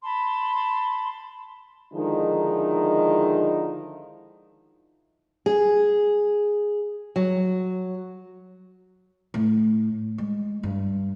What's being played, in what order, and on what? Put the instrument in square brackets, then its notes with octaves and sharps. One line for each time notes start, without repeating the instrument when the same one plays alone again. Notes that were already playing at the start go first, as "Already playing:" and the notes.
[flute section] A5 B5 C6
[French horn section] D3 D#3 F3 G#3 D#4 E4
[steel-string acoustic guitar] G#4
F#3
[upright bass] A2
G#3
G2